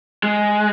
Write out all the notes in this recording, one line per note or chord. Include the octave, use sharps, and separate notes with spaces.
G#3